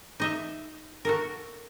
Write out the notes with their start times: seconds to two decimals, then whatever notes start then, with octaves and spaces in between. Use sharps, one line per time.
0.20 D#4 D#5 E5
1.05 F#4 A4 A#4